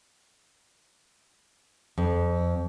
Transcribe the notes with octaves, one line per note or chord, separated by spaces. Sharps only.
F2